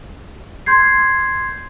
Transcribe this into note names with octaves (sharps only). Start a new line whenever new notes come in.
C6 G6 G#6 C7